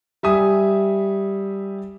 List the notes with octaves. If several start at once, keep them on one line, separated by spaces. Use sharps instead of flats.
G3 E5 G#5 D#6